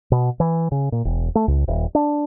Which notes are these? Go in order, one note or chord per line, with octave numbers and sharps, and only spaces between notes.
B2
E3
C#3
A#2
E1
A3
C#2
D#1
D4